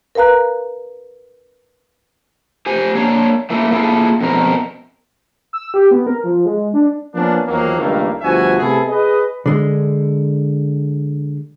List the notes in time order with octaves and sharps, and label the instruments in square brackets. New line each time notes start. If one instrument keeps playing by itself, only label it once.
[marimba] A#4 B4 F5 A#5 F#6
[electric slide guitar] G4 C5 G#5
A#3 D4 C#5
A3 A#3 E4
A#3 E4 F4 G#4 A4
F2 B2 A#4
[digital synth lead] E6
G4
B3
A#4
F3
G#3
D4
[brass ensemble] F3 A#3 B3 C#4 D4
E2 D#3 F3 F#3 A#3
C#2 G2 D#3 A3 A#3
G1 D2 F3 F#4 E5 G#5
C3 A3 B3 E4 G#4 A4
G#4 B4 D#5
[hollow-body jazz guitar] D3 G#3